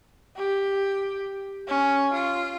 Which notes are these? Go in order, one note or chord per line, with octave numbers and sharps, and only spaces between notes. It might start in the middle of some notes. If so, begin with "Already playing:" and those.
G4
C#4
F4